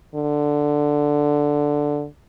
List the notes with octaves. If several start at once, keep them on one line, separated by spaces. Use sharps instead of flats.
D3